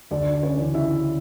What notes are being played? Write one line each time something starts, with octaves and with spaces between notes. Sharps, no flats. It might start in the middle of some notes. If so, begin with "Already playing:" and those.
D2 D4 D5
D5
C#4 C#5
C#3 E3
E4 E5